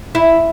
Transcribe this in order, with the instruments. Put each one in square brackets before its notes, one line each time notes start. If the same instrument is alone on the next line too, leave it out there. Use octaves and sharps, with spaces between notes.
[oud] E4